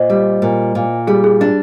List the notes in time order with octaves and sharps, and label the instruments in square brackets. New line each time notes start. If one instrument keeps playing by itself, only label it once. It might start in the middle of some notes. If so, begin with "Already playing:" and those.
Already playing: [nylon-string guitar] A#2 [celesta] C5 D#5
[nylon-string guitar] G3
A#2
A#2
[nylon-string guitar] G3 [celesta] G#4
[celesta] G#4
[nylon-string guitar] D4 [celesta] G#4